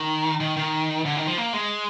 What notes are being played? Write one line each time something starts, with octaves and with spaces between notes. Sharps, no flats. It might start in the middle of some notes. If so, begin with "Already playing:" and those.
Already playing: D#3
D#3
D#3
D3
D#3
F3
A#3
G#3